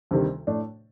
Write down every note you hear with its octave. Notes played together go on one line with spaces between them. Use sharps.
D2 C3 D#3 G3
A2 A3 D4